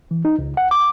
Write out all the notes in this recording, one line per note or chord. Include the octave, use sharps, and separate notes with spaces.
E3
D#4
C#2
F#5
D6